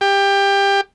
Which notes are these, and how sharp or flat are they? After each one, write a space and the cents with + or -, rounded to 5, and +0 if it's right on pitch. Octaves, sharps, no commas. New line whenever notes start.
G4 +20